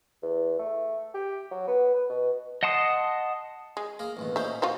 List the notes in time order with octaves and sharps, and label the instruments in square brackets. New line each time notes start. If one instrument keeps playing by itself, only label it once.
[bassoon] E2
A3
G4
F#3
B3
B4
B2
[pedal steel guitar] D#5 F#5 A5 C6 D#6
[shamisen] G#3
[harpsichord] A#3 G#4 A#4
A1 D#2 B2
[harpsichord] A#2 C#4 D#4 [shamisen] C5 E5
[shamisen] F4 F#4 C5